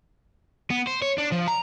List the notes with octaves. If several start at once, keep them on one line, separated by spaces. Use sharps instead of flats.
B3
C5
C#5
D4
F3
A#5